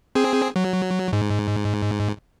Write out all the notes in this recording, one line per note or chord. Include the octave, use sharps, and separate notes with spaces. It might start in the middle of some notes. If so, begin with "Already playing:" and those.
C4 G#4
F#3
G#2